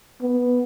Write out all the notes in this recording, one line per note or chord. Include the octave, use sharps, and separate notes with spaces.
B3